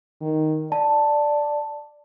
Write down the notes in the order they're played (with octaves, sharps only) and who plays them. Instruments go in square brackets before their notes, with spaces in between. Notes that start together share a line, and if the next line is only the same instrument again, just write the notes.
[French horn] D#3
[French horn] D5 [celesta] A5